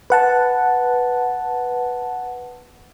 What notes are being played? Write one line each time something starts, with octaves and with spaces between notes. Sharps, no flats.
B4 F#5 A5